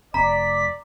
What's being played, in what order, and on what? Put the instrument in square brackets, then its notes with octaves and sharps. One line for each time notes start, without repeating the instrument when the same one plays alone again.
[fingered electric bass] F1 [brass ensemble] D5 [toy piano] A#5 [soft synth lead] B6